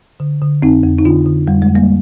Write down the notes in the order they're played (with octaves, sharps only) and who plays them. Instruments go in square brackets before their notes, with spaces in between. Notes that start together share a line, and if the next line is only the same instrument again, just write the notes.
[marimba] D3
D3
F2 C4 D#4
F2
D#4
D3 D4 F4
D3
F2 G3
G#3
F2
G3 A#3